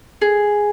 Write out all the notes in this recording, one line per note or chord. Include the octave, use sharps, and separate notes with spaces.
G#4